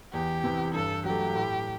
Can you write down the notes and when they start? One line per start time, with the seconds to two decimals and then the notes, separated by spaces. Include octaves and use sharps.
0.13 E2 G4
0.44 C3 E3
0.74 G2 A4
1.05 F#3 A3 G4
1.35 A2